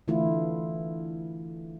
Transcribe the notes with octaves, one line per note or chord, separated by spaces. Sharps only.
D3 E3 A3 E4 F4